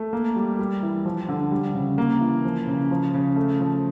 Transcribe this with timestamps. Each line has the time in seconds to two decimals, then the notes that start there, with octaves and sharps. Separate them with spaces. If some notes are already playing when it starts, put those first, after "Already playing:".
Already playing: A3
0.13 A#3
0.36 G3
0.59 G3
0.83 E3
1.05 F3
1.29 D3
1.51 G3
1.75 C#3
1.98 A#3
2.20 E3
2.44 F3
2.67 C#3
2.91 F3
3.14 C#3
3.36 A3
3.60 F3